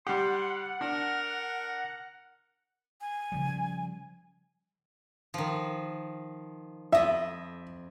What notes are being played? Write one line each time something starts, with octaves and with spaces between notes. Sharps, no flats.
G3 G4 F#5 C6
D4 A#4
G#5
C#3 F3 G3
D#3 F3
F2 D#5 E5 B5